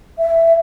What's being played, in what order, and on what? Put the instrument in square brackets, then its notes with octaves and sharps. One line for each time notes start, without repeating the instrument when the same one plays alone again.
[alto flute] E5